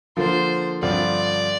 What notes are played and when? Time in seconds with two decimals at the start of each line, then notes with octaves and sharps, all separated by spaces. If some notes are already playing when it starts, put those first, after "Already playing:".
0.17 D3 F3 A#3 F4 C5
0.82 G2 D3 F3 C4 F4 D5